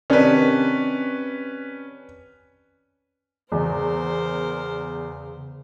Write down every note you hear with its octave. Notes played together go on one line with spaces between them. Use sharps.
C3 D#3 C#4 D4 B4
E2 C#3 A#4 C5